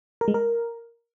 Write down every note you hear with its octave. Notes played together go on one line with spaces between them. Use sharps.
A#4
G#3
A#4